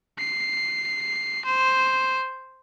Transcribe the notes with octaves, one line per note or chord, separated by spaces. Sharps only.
C7
C5